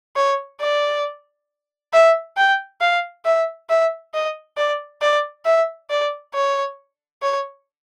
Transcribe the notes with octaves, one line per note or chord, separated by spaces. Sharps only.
C#5
D5
E5
G5
F5
E5
E5
D#5
D5
D5
E5
D5
C#5
C#5